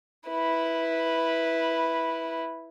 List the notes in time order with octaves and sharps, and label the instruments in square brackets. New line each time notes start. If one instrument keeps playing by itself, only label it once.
[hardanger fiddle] E4 B4